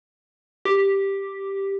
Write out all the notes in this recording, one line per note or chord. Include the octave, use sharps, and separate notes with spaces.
G4